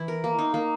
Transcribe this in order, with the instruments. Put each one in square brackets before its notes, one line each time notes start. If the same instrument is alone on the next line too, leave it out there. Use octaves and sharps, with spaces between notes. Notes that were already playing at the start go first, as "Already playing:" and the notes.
Already playing: [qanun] E3 E4
A#4
A#3
D#4
A#3